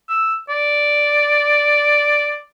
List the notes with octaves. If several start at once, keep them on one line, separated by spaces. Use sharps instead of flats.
E6
D5